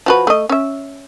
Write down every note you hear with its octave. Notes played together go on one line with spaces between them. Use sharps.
F3 F#4 B4
A3 D#5
C#4 E5